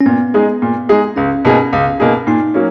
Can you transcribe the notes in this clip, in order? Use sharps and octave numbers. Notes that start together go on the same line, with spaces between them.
C#4
A#2 B3
G#3 D#4 G#4
A#2
G#3 D#4 G#4
C#2 C#4
B2 A#3 D#4 G#4
C#2
B2 A#3 D#4 G#4
A#2 D#4
F#3 A#3 C#4